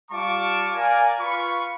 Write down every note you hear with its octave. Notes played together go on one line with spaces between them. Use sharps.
G3 F4 F5 A5 C#6 D6
A#4 D5 F5 G#5
F4 B4 F5 B5 C#6